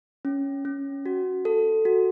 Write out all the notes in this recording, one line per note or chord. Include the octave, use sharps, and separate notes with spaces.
C#4
C#4
F#4
A4
F#4